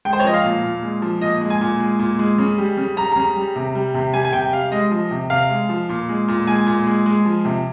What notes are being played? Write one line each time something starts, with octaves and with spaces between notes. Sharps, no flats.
G#3 G5
C5
C#5
F3 D#5
F5
A#2
A#2
G#3
F3
A#2 D#5
G#3
G#5
A#2
G#3
A#2
G#3
C#3
G3
C#3
G3 A#5
C#3 A#5
G3
C3
G3
C3
G3 G#5
G#5
C3 G5
G3 F5
G#3 D#5
F3
C3
C3 F5
G#3
F3
A#2
G#3
A#2
G#3 G#5
A#2
G#3
G#3
F3
C3